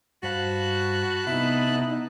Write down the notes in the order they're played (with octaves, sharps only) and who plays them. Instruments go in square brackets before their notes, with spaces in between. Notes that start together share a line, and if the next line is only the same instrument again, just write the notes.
[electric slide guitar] G2 C5 F5 [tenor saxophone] F#4 [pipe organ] A5 B5 F#6
[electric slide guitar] C3 [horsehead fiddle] B3 D#4 [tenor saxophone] E4